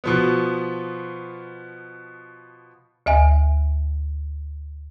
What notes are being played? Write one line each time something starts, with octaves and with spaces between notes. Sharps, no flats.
B2 F3 B3
D2 E5 G#5